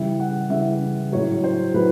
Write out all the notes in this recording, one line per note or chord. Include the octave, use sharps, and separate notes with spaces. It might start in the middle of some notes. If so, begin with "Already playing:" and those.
Already playing: C#3 E3 G3 E5
F#5
C#3 E3 G3 E5
A2 F#3 C#5
C5
A2 F#3 B4